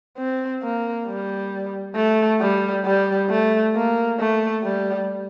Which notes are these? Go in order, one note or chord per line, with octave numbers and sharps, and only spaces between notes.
C4
A#3
G3
A3
G3
G3
A3
A#3
A3
G3